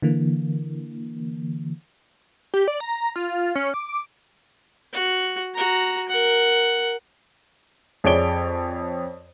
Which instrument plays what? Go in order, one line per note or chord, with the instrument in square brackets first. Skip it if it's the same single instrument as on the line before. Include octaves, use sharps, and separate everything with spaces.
[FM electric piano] D3 E3 A#3
[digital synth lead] G4
D5
A#5
F4
C#4
D6
[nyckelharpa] F#4
F#4 A#5
A#4 F#5
[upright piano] F2 G#4 C#5 D5 D7 G7